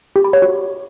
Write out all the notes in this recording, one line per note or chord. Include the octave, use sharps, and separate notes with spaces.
G4
B5
C#5
F#4